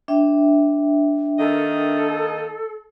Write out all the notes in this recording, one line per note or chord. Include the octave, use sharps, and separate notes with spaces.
D4 E5 G5
D#3 A#3 A4 D#5